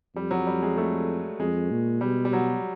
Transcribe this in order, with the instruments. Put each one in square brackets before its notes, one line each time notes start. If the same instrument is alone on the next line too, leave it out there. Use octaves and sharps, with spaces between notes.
[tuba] F2 [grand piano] G3
[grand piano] F#3
G3
G#3
A3
[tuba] F2 [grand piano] G#3
[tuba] A#2
[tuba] B2 [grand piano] G3
[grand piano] G3
F#3